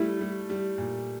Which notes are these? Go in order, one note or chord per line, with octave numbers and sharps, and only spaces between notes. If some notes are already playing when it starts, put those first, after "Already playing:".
Already playing: G3 A3 E4
G3
G3
A#2